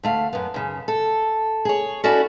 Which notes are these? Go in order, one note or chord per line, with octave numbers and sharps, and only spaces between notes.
D2 A3 F5
F#2 B3
F#2 C#3
A4
G#4 C#5
C#4 E4 F#4 A4 D5